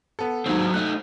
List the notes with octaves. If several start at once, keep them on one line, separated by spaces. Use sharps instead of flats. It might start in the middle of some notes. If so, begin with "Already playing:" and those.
B3 A4
D#2 G#2 F#3 C4
A3 D#4 F#6